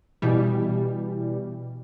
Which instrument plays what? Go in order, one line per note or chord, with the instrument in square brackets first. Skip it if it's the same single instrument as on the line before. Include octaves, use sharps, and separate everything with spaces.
[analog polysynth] B2 E3 G3